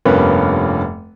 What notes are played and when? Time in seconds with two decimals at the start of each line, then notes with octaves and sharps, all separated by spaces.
0.05 F1 G2 A#3 B3 C#4 B4